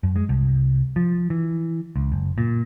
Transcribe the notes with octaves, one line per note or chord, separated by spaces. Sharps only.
F#2
G#3
C2
F3
E3
C#2
F#1
A#2